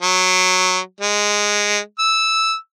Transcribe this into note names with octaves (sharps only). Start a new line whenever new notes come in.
F#3
G#3
E6